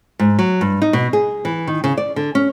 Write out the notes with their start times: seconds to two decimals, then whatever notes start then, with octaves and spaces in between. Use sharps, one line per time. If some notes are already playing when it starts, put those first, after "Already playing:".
0.19 G#2
0.39 F#3
0.61 G2
0.82 D#4
0.93 B2
1.13 G#4
1.45 E3
1.67 D#3
1.84 C#3
1.98 D5
2.16 D3
2.35 C#4